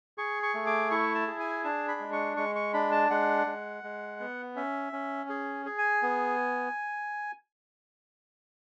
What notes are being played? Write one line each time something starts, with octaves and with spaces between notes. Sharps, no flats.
G#4 C#6
C#6
A3
D6
E4 C#6
A5
G#4
G#5
D4 A5
B5
G#3
C#6
G#3 C#6
C#6
D4 B5
A5
G#3 F#5
G#3
G#3
B3
C#4 E5
C#4
G#4
G#4
G#5
B3